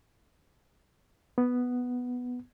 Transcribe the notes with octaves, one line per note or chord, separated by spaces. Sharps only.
B3